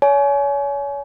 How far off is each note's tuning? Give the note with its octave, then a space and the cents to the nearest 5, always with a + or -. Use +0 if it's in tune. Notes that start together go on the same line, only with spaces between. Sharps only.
C#5 +35 G#5 +30